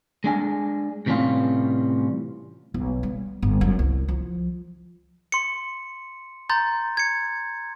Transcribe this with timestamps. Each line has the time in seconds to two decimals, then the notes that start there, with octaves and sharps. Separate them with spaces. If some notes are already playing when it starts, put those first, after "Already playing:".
0.24 G#3 D4 G#5
1.06 A2 C3 E3 G3 C#4 F4
2.74 B1
3.03 G3
3.42 G1
3.61 F#2
3.79 C2
4.08 F3
5.32 C6 C#7
6.49 A#5 C6 G6 A6
6.97 G#6 C#7